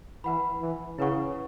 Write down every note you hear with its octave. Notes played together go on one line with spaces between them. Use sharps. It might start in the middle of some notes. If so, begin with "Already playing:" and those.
E3 B4 F#5 B5
E3
C#3 E4 B4 F#5 C#6